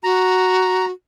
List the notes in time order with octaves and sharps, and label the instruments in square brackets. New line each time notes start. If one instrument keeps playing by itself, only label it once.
[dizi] F#4 [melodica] A#5